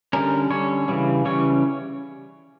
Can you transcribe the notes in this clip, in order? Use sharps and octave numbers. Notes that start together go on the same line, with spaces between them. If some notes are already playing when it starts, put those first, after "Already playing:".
D3 G3 C#4 A#4
D3 G3 C#4 C#5
C#3 E3 G3 C#4
C#3 E3 G3 C#4 C#5